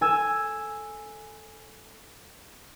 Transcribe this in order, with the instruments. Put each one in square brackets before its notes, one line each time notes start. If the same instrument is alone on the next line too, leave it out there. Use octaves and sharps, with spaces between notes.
[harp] A4 G#5 E6